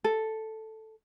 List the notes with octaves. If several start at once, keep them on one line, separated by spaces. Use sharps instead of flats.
A4